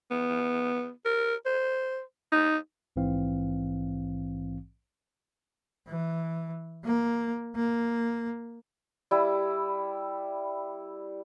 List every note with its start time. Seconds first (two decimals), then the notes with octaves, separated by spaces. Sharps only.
0.11 B3
1.05 A#4
1.46 C5
2.32 D#4
2.96 A#1 G#2 E3 C4 F5
5.88 E3
6.84 A#3
7.55 A#3
9.11 G3 E4